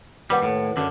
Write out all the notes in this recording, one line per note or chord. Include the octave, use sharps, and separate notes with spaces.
D#2 G3 B4 F#5
A2
F#2 D3